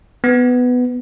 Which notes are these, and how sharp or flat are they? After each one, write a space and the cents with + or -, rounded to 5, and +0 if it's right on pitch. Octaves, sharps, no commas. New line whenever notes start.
B3 +10